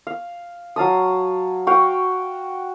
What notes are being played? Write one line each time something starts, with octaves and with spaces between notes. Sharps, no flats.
F5
F#3 F5 A5 D#6
F#4 F5 G5